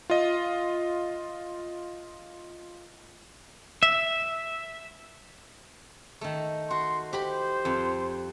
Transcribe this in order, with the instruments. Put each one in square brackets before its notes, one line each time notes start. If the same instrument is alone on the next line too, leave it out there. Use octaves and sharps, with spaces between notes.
[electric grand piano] F4 D#5
[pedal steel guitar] E5
[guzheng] D#3 A3
[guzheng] F#4 [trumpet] C6
[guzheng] G4 B5 [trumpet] C5
[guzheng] F2